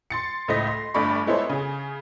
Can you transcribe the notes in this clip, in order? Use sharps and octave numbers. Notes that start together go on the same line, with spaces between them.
C6 A6 C#7
C#2 A2 A3 C5 D#5 A#6
C6
G1 G2 A3 D5 B5 C#6
G#3 B3 E4 A4 C5 C#5
C#3 G#4